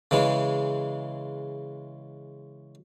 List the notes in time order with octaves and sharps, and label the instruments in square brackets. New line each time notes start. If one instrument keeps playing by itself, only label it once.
[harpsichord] C#3 E3 G#3